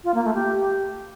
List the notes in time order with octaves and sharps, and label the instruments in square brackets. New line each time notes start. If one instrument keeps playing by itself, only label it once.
[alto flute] F4
A#3
A3
G4